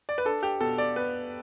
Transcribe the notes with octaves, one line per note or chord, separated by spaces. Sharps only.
D5
B4
D4 A4
G4
B2 A4
D5
B3 B4